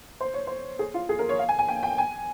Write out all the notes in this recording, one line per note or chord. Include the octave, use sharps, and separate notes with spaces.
C5
C#5
C5
G#4
F4
G#4
A#4
C#5
F5
G#5
G#5
G5
G5
G#5